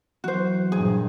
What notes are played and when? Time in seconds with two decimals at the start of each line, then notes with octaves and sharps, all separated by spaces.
0.24 E3 F#3 F#4 C5
0.72 G2 A#2 G#4